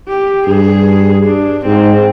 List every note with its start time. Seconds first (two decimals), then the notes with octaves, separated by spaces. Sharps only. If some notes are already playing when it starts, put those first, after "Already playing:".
0.08 G4
0.47 G2 G#4
1.26 D4
1.65 G#2 C4